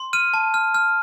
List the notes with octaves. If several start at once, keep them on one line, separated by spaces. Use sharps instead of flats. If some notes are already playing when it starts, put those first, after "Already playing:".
Already playing: C6
F6 D#7
A5
F6
F6